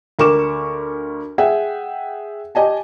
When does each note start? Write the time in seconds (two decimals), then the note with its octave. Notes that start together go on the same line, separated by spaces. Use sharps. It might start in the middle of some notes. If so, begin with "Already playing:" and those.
0.19 D2 A#4 C#6 D6 E7
1.38 G#4 E5 F#5 G5
2.55 G4 D#5 G#5 A5